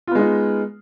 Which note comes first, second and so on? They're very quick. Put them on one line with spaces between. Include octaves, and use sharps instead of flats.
F4 B3 G#3 D#4